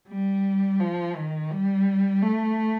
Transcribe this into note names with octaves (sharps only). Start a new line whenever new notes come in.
G3
F3
D#3
G3
A3